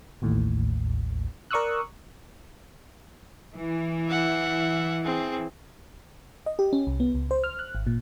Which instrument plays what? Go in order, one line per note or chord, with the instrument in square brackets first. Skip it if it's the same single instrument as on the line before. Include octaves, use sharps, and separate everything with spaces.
[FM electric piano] A1 D#2 A2
A#4 D5 C#6 D#6 E6 F#6
[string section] E3
[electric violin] E5 F#5
C4 G#4
[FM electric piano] D#5
G4
C#4
C2
B3
C#2
C5
F6
F#6
G#1
A#2